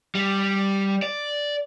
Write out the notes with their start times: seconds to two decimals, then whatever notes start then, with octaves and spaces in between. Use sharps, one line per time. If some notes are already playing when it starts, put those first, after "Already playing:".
0.15 G3
1.02 D5